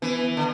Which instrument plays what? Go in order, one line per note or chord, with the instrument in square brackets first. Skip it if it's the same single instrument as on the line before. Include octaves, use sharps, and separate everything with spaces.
[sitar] E3 [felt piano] B3
[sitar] D3